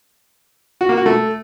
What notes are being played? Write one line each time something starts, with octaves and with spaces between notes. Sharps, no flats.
F#4
A#3
F#4
A3